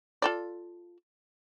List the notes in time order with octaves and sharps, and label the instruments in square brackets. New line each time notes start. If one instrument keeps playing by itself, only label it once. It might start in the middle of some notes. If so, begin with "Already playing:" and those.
[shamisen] F4 A4 D5